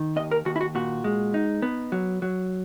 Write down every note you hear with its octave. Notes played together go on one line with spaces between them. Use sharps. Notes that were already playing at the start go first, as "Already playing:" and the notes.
Already playing: D#3
D#2 D#5
A#4
D#2 F#4
E4
F#4
A#2 F#4
G#3
D#4
B3
F#3
F#3